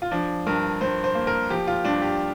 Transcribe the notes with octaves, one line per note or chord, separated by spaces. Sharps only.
F4
F3 D4
G2 A#4
G2 C5
C5
A#3
A#4
F3 G4
F4
G2 D4
G4